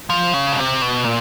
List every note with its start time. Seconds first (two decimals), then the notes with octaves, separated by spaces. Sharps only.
0.10 F3
0.34 C#3
0.52 B2
0.58 C3
0.82 B2
1.05 A#2